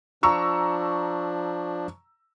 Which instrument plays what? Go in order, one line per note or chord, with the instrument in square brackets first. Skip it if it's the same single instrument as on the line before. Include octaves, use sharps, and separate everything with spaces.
[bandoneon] F3 D4 [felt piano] A#5 C#6 E6